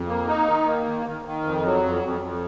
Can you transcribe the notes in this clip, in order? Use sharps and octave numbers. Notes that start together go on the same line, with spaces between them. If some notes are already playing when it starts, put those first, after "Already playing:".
Already playing: F2
A#3
D#4
D#3
A#3
D#3
D#3
D#3
F2
F#3
F2
F2
F2